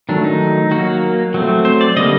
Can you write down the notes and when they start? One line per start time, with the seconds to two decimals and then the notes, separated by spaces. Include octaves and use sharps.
0.09 D#3 F#3 A3 D4
0.24 D#4
0.71 F#3 A#3 F#4
1.34 F#3 A3 C4
1.65 C5
1.81 D5
1.96 D3 G3 A#3 D#5